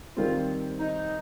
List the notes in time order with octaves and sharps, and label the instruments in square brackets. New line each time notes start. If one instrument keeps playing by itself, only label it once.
[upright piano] D#3 G3 C4 [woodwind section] F4
[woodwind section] D#4